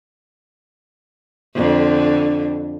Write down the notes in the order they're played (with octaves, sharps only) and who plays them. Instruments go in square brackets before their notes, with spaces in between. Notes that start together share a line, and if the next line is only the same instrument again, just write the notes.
[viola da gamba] F2 D3